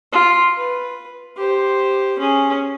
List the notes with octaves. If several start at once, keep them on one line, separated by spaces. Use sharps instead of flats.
F4
B4
G4 C5
C#4 G#4